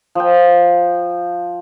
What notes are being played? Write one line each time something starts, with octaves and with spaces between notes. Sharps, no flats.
F3 G5